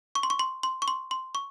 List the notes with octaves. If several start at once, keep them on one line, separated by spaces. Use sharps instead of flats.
C#6
C6
C#6
C6
C6
C#6
C6
C6
C#6